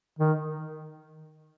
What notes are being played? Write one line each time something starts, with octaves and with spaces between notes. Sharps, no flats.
D#3